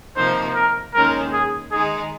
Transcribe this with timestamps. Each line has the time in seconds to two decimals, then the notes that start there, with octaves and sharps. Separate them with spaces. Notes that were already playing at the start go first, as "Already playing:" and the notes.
0.16 C3 F3 A#3 D#4 C5
0.55 A#4
0.93 D#2 D#3 G#3 C#4 A#4
1.33 G#4
1.71 D#3 G#3 D#4 G#4